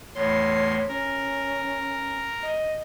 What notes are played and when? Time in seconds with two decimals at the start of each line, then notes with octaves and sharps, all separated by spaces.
0.15 E2 A2 C#5 C6
0.88 C#4 A#4
2.43 D#5